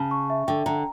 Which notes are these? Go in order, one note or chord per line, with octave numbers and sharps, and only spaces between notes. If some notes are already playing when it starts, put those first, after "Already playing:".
Already playing: C#3 A5
C#6
E5
D3 G5
D3 A#5